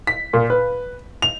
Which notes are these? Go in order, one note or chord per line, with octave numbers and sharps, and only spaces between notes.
B6
A#2
B4
F7